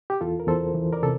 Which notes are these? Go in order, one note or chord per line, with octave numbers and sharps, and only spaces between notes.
G4
E2 F4 A4
A#4
E2 A4 C5
E3
A#4 D5
C3 A4